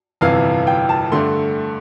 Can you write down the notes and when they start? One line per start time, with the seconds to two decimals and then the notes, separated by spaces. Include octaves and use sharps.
0.21 G1 F2 C3 E3 F5
0.67 G5
0.89 A5
1.12 G2 D3 A3 C6